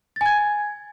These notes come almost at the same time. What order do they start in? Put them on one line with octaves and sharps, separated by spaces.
A6 G#5 G#6